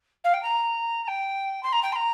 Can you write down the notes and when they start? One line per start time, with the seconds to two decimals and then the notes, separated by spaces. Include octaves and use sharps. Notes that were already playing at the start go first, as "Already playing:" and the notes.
0.24 F5
0.34 G5
0.43 A#5
1.03 A#5
1.08 G5
1.63 C6
1.73 A#5
1.83 G5
1.92 C6
1.96 A#5